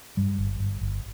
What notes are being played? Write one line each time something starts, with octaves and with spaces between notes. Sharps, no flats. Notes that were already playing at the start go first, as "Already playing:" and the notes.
G2 G3
G1
G1
G1